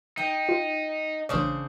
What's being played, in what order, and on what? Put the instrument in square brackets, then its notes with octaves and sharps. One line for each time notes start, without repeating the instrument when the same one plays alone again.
[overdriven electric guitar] D#4 [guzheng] G5
[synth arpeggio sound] F4
[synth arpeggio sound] A1 C#5 [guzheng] C#3 D4 C5